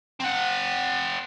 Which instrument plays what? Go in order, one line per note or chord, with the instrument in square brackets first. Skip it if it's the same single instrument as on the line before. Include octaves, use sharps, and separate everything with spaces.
[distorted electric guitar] C4 F#5